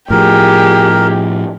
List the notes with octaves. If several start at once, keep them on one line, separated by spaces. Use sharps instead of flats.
A2 F3 G4 G#4 A#4